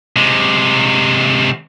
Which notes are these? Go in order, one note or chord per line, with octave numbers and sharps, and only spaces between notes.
C3 G#3